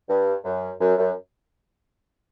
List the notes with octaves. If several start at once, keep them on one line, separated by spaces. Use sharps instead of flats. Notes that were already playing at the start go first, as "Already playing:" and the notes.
G2
F#2
F#2
F#2